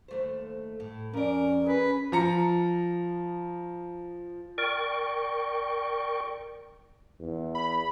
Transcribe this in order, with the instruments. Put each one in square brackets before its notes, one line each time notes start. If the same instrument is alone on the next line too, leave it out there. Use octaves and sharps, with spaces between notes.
[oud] D#2 A3 C5
A2
[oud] F2 D5 [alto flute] C#4 [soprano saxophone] A#4
[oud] G#4 [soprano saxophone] B4
[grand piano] F3 A#5 C#7
[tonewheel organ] A#4 D5 G5 C#6
[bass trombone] E2
[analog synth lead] B5